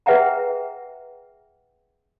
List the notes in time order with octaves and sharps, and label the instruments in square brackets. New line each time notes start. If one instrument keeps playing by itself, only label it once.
[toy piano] G#4 B4 E5 F#5 G5 A#5